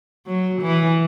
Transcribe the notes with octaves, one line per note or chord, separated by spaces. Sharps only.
F#3
E3